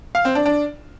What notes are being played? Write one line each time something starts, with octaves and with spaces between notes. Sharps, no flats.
F5
C4
D4
D4